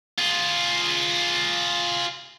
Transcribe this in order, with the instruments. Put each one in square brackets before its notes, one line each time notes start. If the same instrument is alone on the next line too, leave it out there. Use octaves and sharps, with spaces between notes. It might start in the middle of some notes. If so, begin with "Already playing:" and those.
[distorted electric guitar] F4 G#4